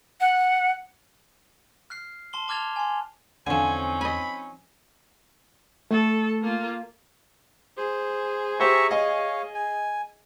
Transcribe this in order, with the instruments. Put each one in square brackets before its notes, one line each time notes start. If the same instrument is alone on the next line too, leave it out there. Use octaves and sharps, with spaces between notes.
[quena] F#5
[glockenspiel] F6 F#6 C7
A5 C6 G7
A5 D6 F6 G#6 A6 F7
G#5 C6
[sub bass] E2 [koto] D3 F3 [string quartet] C4 C#4 D#4 [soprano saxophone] G#5
[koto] D#5 G#5 [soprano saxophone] B5
[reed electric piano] A3 [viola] A4
[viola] A#3 F4
[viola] G#4 [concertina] C5
[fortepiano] G4 C5 [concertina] E5 A#5 C#6
[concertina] C#5 F5 [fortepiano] D#5
[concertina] G#5